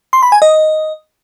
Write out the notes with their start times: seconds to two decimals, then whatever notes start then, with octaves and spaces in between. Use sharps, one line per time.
0.13 C6
0.23 B5
0.32 G#5
0.42 D#5